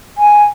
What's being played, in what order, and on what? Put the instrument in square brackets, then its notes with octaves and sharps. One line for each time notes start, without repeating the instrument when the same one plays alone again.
[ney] G#5